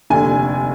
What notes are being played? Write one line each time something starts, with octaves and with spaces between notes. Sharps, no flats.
F1 D#2 D3 G#5